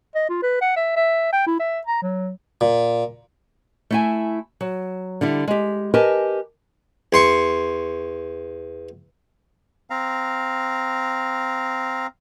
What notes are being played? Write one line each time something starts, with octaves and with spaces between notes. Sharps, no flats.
D#5
F4
B4
F#5
E5
E5
G5
E4
E5
A#5
F#3
A#2
A3 E4 G#5
F#3
D3 G3 E4
G#3 G4
G4 A#4 B4 D#5 G#5 A5
E2 C6 C#6
C4 F5 A#5